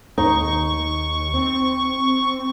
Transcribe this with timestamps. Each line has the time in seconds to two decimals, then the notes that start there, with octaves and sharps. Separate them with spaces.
0.18 D#2 D#4 C#6
1.34 C4